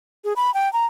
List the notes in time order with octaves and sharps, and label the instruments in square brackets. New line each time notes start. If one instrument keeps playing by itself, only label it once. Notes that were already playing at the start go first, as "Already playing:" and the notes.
[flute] G#4
B5
G5
A#5